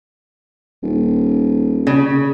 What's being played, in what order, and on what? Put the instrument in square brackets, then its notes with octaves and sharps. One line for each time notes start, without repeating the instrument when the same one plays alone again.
[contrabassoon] D#1
[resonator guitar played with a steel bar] C#3